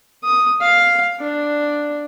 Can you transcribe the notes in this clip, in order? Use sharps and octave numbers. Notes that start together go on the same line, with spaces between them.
D#6
F5
D4